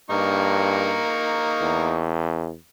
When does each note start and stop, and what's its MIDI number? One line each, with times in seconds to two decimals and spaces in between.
0.10 1.03 43
0.10 2.06 58
0.10 2.06 63
0.10 2.06 85
1.61 2.56 40